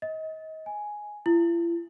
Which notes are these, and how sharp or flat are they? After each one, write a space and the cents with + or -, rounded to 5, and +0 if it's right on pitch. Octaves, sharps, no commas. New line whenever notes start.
D#5 +30
G#5 +5
E4 +45